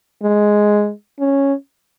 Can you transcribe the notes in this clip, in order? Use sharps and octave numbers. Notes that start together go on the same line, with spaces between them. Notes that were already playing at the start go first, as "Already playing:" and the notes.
G#3
C#4